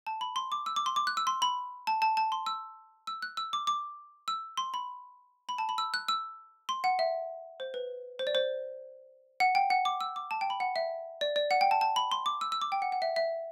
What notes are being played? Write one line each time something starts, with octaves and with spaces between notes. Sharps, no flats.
A5
B5
C6
D6
E6
D6
C6
D6
F#6
E6
C6
B5
A5
A5
A5
C6
E6
E6
F#6
E6
D6
D6
E6
C6
B5
B5
A5
B5
E6
F#6
E6
C6
F#5
E5
C5
B4
C5
D5
C5
F#5
G5
F#5
D6
E6
D6
A5
G5
B5
F#5
E5
D5
D5
F#5
G5
A5
A5
B5
C6
D6
E6
E6
D6
G5
F#5
F#5
E5
E5